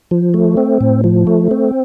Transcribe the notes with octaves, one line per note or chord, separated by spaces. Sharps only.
F3
A3
C4
A2
F3
A3
C4